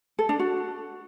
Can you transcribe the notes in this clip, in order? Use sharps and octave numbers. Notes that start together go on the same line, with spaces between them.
A4
D4
F#4